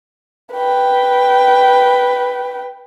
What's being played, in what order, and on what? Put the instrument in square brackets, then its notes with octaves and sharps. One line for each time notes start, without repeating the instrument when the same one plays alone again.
[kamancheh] B4 G5